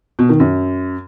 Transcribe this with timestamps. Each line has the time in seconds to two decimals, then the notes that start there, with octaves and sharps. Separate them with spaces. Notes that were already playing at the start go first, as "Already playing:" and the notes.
0.19 B2
0.29 D#3
0.40 F#2